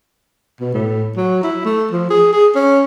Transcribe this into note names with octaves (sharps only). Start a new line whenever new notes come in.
B2
A2
F#3
E4
A3
F3
G#4
G#4
C#4